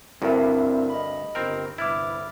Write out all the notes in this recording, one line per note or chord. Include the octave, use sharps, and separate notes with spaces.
D2 G2 C4 E4 A#4 E5
D#5 B5
G1 D#3 C4 A#4
G1 C2 E4 B4 D6 F6 A6